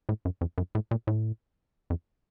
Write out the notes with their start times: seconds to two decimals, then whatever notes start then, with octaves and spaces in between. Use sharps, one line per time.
0.09 A2
0.25 F#2
0.41 F2
0.58 F#2
0.75 A2
0.91 A#2
1.07 A2
1.90 F2